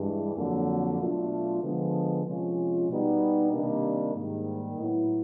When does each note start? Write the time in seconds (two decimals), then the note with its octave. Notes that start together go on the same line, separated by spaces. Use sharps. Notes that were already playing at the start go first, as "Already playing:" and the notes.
Already playing: G2 E3 G#3
0.36 F2 D3 F#3 A#3
0.99 B2 F#3 A3 D4 F4
1.62 D3 F3 G#3 B3
2.25 C3 F3 G#3 C#4 F4
2.88 B2 G3 B3 D#4
3.51 C3 D#3 G3 A#3 D4
4.14 G#2 D#3 G3 A#3
4.77 A2 F#3 B3 E4